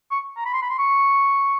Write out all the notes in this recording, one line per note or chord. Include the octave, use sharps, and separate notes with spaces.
C#6
A#5
B5
C6
B5
C6
C#6